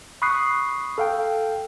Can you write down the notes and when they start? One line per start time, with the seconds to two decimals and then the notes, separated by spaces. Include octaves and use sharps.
0.22 B5 C#6 D#6 F#6 C7
0.98 A4 F5 G5